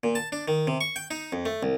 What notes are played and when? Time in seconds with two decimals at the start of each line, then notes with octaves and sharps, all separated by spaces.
0.04 A#2
0.15 A5
0.32 D4
0.48 D#3
0.67 C3
0.81 C#6
0.96 G5
1.11 D#4
1.32 F2
1.45 A3
1.63 C2